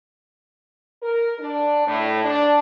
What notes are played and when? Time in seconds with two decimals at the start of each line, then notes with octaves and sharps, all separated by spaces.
1.03 A#4
1.40 D4
1.87 A2
2.24 D4